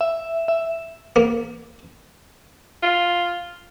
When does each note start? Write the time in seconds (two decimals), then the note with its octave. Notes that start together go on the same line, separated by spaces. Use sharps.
0.01 E5
0.48 E5
1.16 A#3
2.83 F4